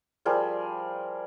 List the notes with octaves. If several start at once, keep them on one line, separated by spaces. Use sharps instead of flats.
F3 G3 G#4 A#4